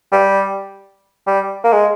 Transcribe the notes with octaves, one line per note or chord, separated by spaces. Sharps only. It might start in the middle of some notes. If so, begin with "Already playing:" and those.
G3
G3
A#3
G#3